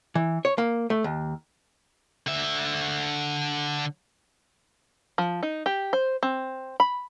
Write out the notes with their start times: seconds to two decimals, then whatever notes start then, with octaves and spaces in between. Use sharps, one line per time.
0.15 E3
0.45 C#5
0.58 A#3
0.90 A3
1.04 D#2
2.27 D3 E5
5.18 F3
5.43 D#4
5.66 G4
5.93 C5
6.23 C4
6.80 B5